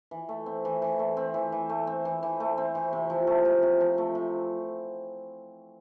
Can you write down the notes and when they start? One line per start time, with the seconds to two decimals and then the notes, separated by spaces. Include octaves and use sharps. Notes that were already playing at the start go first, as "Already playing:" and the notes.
0.11 E3
0.29 A3
0.46 C4
0.65 E3
0.82 E3
0.99 A3
1.17 C4
1.34 E3
1.52 E3
1.69 A3
1.87 C4
2.05 E3
2.23 E3
2.40 A3
2.58 C4
2.75 E3
2.93 C3
3.10 F3
3.27 A3
3.45 C3
3.63 C3
3.81 F3
3.98 A3
4.15 C3